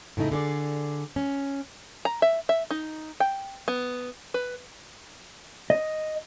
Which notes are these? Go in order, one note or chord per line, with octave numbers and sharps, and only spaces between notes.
A2 C#3 A3 D#4 E4
D3 G#4 D5
C#4
A#5
E5
E5
D#4
G5
B3
B4
D#5